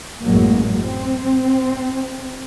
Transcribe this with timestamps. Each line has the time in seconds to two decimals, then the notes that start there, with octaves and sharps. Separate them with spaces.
0.22 A1 F#2 A2 F#3 G#3 A#3
0.84 C4